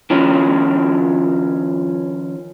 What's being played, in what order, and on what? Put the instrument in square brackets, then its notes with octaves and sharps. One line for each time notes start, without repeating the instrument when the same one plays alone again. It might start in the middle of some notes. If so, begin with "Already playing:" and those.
[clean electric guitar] D#3 F3 C#4